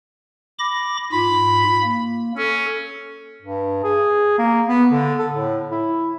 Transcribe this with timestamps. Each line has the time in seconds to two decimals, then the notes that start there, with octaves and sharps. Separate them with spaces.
0.59 B5 D6 A#6
1.13 G#2 F4 B5
1.83 A#3
2.37 C#4 A4
3.42 G2
3.84 G#4
4.38 A#3
4.68 B3
4.92 D3
5.19 A4
5.32 A2
5.71 E4